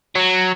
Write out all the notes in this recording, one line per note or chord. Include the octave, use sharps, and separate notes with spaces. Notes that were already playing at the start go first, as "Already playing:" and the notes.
F#3